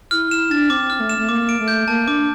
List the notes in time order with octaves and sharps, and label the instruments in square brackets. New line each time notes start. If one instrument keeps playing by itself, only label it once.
[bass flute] E4 [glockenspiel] F6
[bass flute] E4 [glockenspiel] E7
[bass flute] D4 [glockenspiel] A6
[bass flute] C4 [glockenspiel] D6
[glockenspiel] F6
[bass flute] A3
[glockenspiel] E7
[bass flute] A3
[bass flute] A#3 [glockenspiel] D6
[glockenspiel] D7
[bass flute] A3
[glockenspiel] G6
[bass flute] A#3 [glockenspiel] A5
[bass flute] D4 [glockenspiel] D6